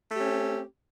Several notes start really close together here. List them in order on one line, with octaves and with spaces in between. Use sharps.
A3 G4 C#4 C4